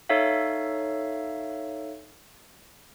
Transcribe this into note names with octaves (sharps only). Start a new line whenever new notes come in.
D#4 A4 C#5 E5 F5